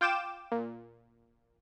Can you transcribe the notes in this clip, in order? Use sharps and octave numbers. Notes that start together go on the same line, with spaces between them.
F4 G5 D6 E7
A#2